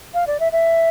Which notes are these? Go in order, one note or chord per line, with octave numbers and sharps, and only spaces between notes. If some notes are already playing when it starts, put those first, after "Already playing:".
F5
D5
E5
E5